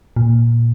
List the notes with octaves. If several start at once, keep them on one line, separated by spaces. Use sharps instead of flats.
A#2